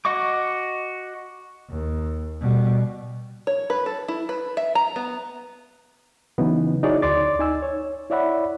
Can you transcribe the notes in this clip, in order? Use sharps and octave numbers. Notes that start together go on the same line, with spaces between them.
F#4 D#5 C#6 D6
D#2
B2 G3
C#5
B4
A4
E4
B4
E5
A#5
B3
C#3 E3 F#3 B3 D#4
D#4 E4 F#4 G#4 C#5 D5
D2 D5 C6 D6 A6
D#4 G#5 E6
C#5
E4 C#5 D5 E5 F#5 B5